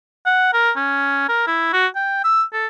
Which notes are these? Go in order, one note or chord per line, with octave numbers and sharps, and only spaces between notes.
F#5
A#4
C#4
A#4
E4
F#4
G5
E6
A4